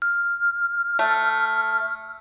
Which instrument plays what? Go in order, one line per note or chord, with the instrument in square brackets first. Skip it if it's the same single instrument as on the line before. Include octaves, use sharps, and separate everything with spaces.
[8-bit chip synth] F6
[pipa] A3